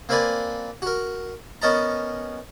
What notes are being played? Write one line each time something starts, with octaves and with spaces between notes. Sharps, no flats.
A#3 C4 A#4 B4 D5 G#5
F#4 A#4
B3 C#4 A#4 D#5 A5 A#5